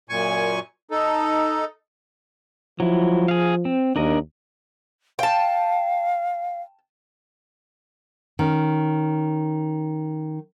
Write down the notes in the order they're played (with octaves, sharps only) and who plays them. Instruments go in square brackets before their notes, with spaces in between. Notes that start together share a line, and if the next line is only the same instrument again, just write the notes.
[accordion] F#2 A#2 G#5 C#6
D#4 A4
[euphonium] F3 [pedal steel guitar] F#3 E4
[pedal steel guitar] G#4 F5
C4
[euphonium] D#2 [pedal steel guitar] D4 A#4 D#5
[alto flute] F5 [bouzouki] G5 A5
[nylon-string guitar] D#3 C#4